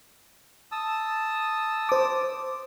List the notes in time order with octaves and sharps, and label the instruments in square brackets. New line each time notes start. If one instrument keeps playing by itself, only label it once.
[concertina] A5 D#6 E6
[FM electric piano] C5 D6